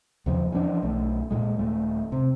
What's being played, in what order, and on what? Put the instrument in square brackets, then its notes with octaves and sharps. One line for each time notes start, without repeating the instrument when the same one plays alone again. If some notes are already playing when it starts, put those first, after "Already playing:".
[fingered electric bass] E2 C#3 F3
E3 F3 C#4 D4
B1 A3
A#2 G#3
D#1 A3
C3